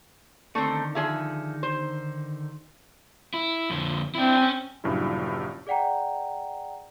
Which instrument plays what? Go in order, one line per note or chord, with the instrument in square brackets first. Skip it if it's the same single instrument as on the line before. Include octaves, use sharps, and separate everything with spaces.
[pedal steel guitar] D3 D#3 D#4 [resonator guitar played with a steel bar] A3 C4
[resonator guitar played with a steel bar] F3 G#4 E5
C5
[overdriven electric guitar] E4
F2 D3
[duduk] C4 [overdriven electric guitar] D4 E4
[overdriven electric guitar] C#4 G#5
[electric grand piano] A#1 G2 C#3 F#3 E4
[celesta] G#4 D5 F#5 G5 A#5